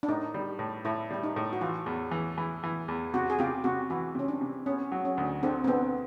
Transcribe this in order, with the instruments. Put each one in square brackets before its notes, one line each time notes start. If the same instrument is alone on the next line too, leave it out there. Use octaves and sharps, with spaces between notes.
[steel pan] D4
[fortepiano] A2 [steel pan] D#4
[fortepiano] G3
A2
[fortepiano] A2 [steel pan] E4
[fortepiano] G3 [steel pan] E4
[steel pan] D#4
[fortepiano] A2
[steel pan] F#4
[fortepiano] E3 [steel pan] F4
[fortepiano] E2
E3
E3
E3
E2
[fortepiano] C3 [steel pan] F#4
[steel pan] G#4
[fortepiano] C3 [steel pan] F4 G4
[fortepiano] C3 [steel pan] F#4
[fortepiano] E3 [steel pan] F#4
[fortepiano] C3 [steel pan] C#4
[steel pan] D4
[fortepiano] C3
[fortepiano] B3 [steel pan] C#4
[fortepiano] F#3
[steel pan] C#4
[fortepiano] D2
[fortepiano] D3 [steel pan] C4
[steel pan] C4
[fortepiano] D3 [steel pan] B3